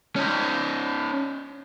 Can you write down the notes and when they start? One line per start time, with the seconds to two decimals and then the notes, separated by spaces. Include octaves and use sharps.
0.16 C#4 D#4